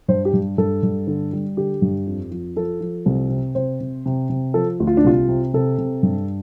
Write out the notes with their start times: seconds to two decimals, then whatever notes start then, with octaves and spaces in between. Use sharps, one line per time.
0.08 G2 C5
0.25 G4
0.33 G2
0.58 G2 A4
0.83 G2
1.07 D3
1.33 G3
1.57 D3 G4
1.82 G2
2.07 F2
2.31 F3
2.56 F3 A4
2.81 F3
3.06 C2
3.30 C3
3.55 C3 C5
3.80 C3
4.06 C3
4.30 C3
4.54 F3 A4
4.80 D2
4.87 F4
4.97 D4
5.04 C2 F4
5.28 C3
5.54 C3 A4
5.78 C3
6.03 G2